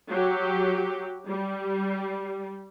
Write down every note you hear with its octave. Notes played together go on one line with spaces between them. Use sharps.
F#3 G4
G3